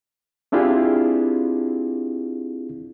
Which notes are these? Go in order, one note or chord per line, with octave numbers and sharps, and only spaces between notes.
C4 D4 E4 F4 G4 G#4